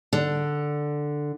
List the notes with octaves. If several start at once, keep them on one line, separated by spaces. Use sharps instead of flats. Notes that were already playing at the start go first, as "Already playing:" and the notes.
D3